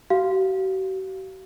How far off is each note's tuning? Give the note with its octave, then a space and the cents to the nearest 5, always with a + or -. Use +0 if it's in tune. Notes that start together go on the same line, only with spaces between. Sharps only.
F#4 +45 F5 +0